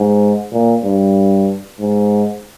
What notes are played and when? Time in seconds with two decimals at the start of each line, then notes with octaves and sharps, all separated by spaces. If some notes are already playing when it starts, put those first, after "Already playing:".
Already playing: G#2
0.52 A#2
0.84 G2
1.80 G#2